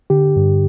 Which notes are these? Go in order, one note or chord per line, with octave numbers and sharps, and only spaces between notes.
D3 G4
G2